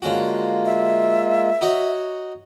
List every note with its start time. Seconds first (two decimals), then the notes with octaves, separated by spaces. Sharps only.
0.02 D3 G#3 A#3 C#4 F4 F#4
0.66 E5
1.61 D#4 F#4 C#5